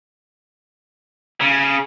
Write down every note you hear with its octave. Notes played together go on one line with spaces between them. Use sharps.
C#3